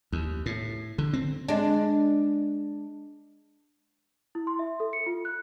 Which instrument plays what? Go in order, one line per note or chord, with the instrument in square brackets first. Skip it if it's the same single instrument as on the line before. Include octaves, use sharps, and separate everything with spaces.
[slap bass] D#2
A2
D3
C4
[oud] G#3 D4
[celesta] E4
C6
E5
A4
C#7
F4
F#6